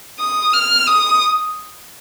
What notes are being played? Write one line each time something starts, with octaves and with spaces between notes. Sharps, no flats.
D#6
F6
D#6